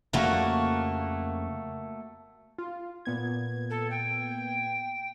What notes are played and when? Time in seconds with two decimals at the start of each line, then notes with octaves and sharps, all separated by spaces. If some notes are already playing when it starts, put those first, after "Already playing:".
0.13 F2 C#3 F3 A3 A#3 F#4
2.58 F4
3.05 A#2 B3 G#6
3.70 A4
3.90 G5